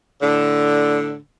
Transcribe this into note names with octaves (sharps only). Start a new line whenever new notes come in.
A2 D3